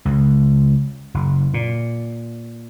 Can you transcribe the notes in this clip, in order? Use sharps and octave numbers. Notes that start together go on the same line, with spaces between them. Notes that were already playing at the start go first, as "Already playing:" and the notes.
C#2
F#1
A#2